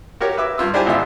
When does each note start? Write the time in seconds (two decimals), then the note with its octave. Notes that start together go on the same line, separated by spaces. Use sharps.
0.21 F#4 G4 A#4 C#5
0.37 B4 E5 D6
0.58 G2 F4 E6
0.74 D4 E4 G4 C5 F5 G#5
0.86 G#1 A#2 D3 C5 E5